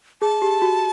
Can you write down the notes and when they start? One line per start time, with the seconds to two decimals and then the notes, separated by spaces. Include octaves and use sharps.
0.22 G#4 A5
0.42 G4
0.62 F#4